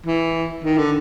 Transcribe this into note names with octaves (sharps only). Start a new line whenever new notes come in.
E3
D#3
D3